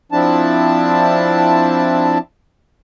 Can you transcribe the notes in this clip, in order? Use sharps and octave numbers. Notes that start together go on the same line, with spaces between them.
F3 C4 D4 E4 A5